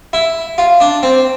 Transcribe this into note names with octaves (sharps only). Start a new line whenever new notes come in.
E4
F4
D4
C4